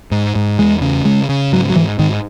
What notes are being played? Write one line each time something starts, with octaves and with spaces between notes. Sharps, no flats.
G#2
G#2
E2 G#3
C#3
C#3 G#3
C#3
G#2 F#3
F#3
G#2 E3
G#2 D#3